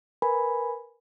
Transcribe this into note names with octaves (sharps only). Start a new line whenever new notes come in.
A#4 B4 G#5 B5